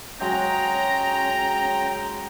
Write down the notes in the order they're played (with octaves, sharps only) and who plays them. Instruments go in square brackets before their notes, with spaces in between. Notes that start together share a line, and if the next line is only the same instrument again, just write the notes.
[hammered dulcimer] F#3 G#3 [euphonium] C#4 [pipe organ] G5 [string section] A#5